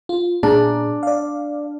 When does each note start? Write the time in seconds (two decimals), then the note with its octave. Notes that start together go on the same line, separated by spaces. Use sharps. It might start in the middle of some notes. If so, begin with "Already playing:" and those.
0.09 F4
0.43 A#2 D4 G#4 A#5
1.03 D5 F5